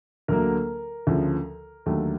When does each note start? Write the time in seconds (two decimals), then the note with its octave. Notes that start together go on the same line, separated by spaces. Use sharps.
0.28 D2 D3 F#3 A#3 A#4
1.07 D2 C#3 F3
1.86 D#2 D3 F#3 A3